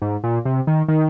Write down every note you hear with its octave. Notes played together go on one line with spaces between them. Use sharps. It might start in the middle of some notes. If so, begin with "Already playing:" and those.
G#2
A#2
C3
D#3
D#3